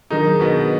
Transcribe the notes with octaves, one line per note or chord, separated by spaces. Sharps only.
D#3 F#3 D4 D#4 F4 G#4
B2 B3